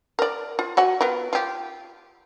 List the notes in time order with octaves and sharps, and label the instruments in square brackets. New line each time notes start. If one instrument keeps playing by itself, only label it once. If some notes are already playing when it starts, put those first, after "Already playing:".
[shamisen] A#4 D5
F4
F#4 F#5 G#5
B3 F4 A#4
F4 G4